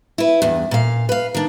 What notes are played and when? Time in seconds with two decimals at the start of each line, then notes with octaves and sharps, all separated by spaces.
0.18 E4 B4
0.42 E2 G2
0.71 A#2 F5
1.09 B4 F5
1.34 D#3 D4